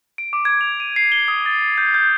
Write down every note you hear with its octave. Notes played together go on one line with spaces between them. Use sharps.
D7
D6
G#6
F7
D#7
C7
G7
D#6
A6
G6
G6